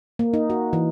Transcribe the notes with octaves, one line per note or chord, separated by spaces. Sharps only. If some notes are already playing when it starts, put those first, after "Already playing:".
A#3
D#4
F#4
E3